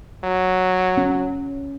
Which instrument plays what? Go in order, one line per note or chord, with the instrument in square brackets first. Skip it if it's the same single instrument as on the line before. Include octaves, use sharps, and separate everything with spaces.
[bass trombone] F#3
[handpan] C#4